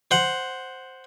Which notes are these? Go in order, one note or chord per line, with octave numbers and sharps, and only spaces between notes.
C5 F#5